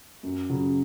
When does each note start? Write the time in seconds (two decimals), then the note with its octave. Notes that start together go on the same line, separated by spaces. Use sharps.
0.23 F#2
0.50 C#3 F#3